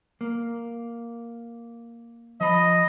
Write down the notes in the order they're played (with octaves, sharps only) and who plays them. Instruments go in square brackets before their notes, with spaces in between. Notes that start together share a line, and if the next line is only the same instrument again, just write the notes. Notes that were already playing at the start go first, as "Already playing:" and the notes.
[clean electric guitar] A#3
[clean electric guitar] F3 B5 [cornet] D#5